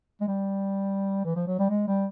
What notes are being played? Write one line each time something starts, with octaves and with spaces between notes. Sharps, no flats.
G#3
G3
E3
F3
F#3
G3
G#3
G3